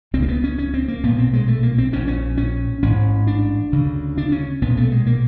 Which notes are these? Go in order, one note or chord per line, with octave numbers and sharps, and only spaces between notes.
C#2 C#3 C4
A#3
B3
C#4
C#4
C4
A#3
B1 A#2 B3
C4
G#3
A3
A#3
C4
A#1 A#2 C#4
C#4
C#4
A1 G#2 C#4
D4
D2 C#3
D4
C#4
B1 A#2 B3
A3
G#3
A#3